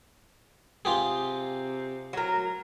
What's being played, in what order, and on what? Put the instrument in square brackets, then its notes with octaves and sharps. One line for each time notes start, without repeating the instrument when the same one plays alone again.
[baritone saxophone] C3 [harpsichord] F4 G4 G#4
[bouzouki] F#3 A#4